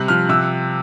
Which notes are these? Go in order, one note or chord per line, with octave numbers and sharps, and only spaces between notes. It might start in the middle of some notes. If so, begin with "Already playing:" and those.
Already playing: C3 G3 F#6
F3 F6
C3 E6